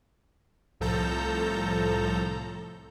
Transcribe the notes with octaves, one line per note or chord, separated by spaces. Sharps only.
C2 A2 F3 A4 A#5 G6